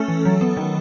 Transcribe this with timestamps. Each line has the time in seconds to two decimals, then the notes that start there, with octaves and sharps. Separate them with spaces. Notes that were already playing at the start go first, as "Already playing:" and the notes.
Already playing: A3 C#4 A4
0.08 E3
0.25 F#3
0.41 B3
0.57 D#3